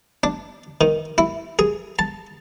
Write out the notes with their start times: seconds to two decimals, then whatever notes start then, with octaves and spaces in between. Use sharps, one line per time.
0.23 D4
0.81 D#3
1.18 E4
1.59 G#4
1.99 A5